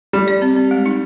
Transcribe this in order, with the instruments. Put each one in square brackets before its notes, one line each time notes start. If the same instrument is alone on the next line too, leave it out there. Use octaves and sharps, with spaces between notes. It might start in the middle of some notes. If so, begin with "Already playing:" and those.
[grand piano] G3 [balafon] G4
[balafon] D5
C4
C4
G#3
D#4